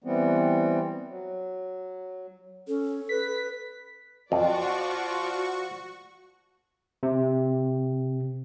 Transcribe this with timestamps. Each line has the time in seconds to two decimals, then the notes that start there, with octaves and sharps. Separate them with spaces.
0.04 E3 G3 B3 C4
1.08 F#3
2.68 C#4 A4
3.09 B4 B6
4.32 F2 F3 F4 F#4 D5 C#6
7.03 C3